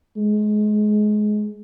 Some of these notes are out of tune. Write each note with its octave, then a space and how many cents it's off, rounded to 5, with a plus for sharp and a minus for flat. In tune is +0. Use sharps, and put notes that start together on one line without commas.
G#3 +25